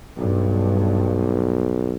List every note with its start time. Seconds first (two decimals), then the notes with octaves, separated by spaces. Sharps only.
0.18 B1 G2